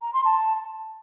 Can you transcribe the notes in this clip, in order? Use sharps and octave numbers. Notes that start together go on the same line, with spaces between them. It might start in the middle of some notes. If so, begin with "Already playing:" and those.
A#5
C6
A5